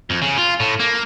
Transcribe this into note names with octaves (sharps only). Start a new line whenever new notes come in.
F2
C#3
F4
A2
A#3